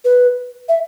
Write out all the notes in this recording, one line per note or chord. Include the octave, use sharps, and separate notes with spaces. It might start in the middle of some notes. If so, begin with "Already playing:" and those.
B4
E5